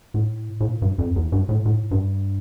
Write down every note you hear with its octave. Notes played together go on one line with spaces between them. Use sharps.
A2
A2
A#2
G2
F2
E2
G2
A2
A2
G2